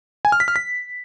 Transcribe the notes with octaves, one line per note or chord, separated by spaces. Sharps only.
G#5
F6
B6
F6
B6